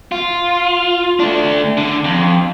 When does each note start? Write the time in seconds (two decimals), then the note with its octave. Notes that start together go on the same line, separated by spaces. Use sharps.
0.12 F4
1.20 A3 D4
1.78 D3
2.05 F2